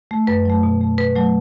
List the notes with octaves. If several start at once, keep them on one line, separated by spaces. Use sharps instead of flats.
A3
F#2 B4
F#3 A3
B2
A3
B2 B4
F#3 A3